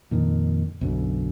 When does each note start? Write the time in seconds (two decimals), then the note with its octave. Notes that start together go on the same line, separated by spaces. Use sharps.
0.11 F2 A#2 D#3
0.81 B1 F#2 D3